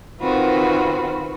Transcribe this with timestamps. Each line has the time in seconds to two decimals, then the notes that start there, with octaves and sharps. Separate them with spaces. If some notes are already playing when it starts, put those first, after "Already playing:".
0.21 D#3 C4 F4 F#4 B4